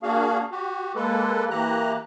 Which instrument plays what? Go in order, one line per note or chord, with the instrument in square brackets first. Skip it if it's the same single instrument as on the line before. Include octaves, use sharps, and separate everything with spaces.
[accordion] A#3 D4 F#4 G#4 F5
F#4 G4
G#3 A#3 A4 B4
E3 A#3 G4 A#5 F#6